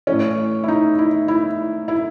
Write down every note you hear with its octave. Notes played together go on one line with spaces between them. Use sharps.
A2 E3 C#4
E4
D#4
E4
E4
E4